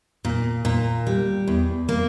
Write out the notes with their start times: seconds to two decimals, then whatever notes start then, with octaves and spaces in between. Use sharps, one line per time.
0.25 A#2
0.65 A#2
1.07 G3
1.47 E2
1.89 A#3